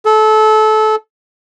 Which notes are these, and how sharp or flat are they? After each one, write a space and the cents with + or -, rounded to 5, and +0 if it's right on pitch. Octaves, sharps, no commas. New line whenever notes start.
A4 -25